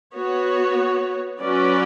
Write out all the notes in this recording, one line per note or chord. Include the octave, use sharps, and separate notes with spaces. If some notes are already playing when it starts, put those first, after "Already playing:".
B3 F#4 C#5
F#3 C#4 F#4 B4 D5